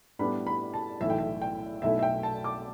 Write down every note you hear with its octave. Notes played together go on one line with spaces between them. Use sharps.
A2 G3 B3 D4 B5
B5
A5
B1 A2 E3 A3 E4 E5
G5
E5
G5
B1 B2 A3 E4 E5
E5
G5
A5
D6